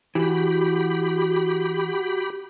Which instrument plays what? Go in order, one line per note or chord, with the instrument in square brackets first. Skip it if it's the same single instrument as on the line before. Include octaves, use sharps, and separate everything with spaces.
[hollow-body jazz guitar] E3 [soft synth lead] F#4 [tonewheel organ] G4 B5